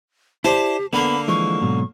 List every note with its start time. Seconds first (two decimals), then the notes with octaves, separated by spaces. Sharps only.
0.44 E4 G4 C5 D5 A5
0.93 D3 A#3 B3 B5
1.28 E3 F3 G#3 C#6
1.62 G#2 B2 F#3